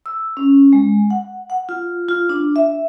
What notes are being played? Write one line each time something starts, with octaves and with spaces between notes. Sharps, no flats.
E6
C#4
G#3
F#5
F#5
F4
F4
D4
E5